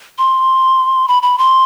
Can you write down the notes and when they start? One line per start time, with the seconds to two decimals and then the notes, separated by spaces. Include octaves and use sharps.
0.18 C6
1.08 B5
1.23 B5
1.38 C6